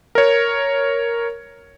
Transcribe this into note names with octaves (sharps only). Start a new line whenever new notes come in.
A#4 C#5